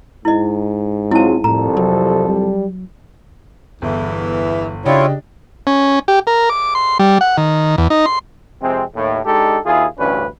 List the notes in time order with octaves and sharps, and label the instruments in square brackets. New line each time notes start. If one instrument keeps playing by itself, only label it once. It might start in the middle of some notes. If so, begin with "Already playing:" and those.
[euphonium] G#2 [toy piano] E4 D#5
[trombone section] F#3 G#3 F4 [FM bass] C4 [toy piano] E4 A5
[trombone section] C2 F2 A4 [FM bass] A2 [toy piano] A#5
[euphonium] C3 [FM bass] F#3
[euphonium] G3
[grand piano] G1 [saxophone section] E2 E3
[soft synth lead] C#3 [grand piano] D4 G4 D#5 [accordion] E4 F4 C#5
[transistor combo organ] C#4
G4
A#4
D6
C6
G3
F#5
D#3
E2
D#4
C6
[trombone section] F2 C3 G#3 C4
D#2 A2
G#3 D4 D#4 G4 A4
D#2 E4 F4 G#4
A1 D2 G2 C#4 B4